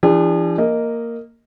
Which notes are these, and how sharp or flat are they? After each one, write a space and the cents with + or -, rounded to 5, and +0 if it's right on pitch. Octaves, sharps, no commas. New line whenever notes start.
E3 +45 D4 +0 G#4 -45
A#3 -10 D#5 +0